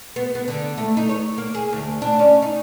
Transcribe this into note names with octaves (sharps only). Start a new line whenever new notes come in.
B3
B3
D3
A3
D#4
C#5
A#3
G#4
D2
D4
C#4
D#4